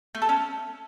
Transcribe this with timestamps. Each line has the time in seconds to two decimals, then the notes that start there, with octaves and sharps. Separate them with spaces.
0.15 A3
0.22 A4
0.29 C#4